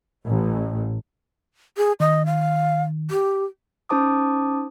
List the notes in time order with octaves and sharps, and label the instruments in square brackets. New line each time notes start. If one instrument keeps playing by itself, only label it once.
[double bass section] A1
[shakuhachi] G#4
[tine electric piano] D#3 [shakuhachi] D#5
[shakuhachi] F5
G4
[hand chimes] C#4 D#4 C5 A5 D6 D#6